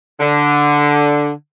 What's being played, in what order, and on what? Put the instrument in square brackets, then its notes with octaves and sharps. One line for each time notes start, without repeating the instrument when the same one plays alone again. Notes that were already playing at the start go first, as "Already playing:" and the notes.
[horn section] D3